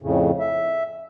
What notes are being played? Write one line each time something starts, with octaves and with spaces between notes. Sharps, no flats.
F2 A2 C#3
E5